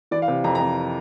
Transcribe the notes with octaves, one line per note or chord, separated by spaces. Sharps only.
E3 D5
F5
C3
F2 A#5
A#5
F2